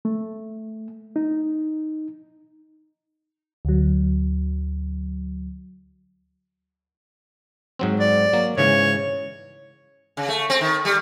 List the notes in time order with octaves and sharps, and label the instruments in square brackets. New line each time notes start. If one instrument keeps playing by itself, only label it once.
[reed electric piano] A3
D#4
[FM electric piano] D2 F#3
[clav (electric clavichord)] G#2 F#3 C4
[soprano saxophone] D5
[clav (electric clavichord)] F#3 A#3
[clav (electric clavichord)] G#2 C#3 E3 [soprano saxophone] C#5
[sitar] C#3
A3
C4
D#3
G3